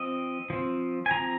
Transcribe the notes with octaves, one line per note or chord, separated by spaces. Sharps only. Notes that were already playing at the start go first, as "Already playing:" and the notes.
Already playing: F3 C4 D#5
F3 C4
G#5
F3 C4 A#5